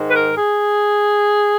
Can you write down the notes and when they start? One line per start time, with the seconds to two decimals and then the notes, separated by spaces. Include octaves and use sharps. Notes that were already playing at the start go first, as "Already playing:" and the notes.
Already playing: G#2 D#3
0.08 B4
0.14 A#4
0.36 G#4